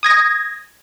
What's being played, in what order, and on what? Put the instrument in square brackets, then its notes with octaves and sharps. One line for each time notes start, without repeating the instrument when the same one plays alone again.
[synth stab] D#6 G#6 A#6